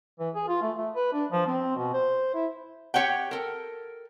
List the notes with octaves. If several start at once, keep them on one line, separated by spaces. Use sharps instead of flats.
E3
G#4
F4
A3
A3
B4
D4
F3
C4
B2
C5
E4
G4 C#5 F#5 G5
A4 A#4